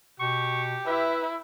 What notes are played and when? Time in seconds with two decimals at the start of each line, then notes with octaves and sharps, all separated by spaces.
0.20 B2 G4 C#6
0.87 E4 B4 E5